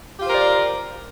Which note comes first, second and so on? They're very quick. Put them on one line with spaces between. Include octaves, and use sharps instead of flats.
G4 F4 C5 A#4 D5